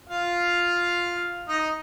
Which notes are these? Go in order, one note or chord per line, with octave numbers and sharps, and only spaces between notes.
F4 F5
D#4 D#5